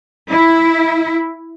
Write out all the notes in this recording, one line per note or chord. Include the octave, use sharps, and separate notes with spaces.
E4